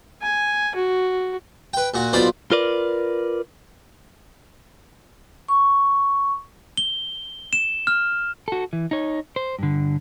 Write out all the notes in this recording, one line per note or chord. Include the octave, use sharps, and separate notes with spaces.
G#5
F#4
B4 G5
A#2 F#4
B1 F4 C5 D5 B5
F4 A#4 B4 D5
C#6
G7
E7
F6
F#4 A4
E3
D#4 C#5
C5
G2 D3